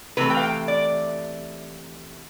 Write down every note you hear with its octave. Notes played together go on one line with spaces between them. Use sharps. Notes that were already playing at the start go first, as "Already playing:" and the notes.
C3 E3 A3 B4
G5
F5
G5
D5